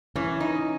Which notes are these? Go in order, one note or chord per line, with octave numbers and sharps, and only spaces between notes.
E3 C#4
D#4